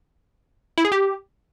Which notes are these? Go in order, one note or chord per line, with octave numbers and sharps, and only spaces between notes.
E4
G#4
G4